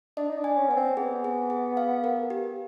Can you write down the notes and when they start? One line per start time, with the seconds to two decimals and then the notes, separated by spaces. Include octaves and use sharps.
0.17 D4 D#5
0.29 D#4
0.37 D4
0.44 G#5
0.57 C#4
0.69 B3 G#5
0.77 C4
0.97 B3 G#4
1.24 G#4
1.50 G#4
1.77 F5
2.04 A#4
2.30 G4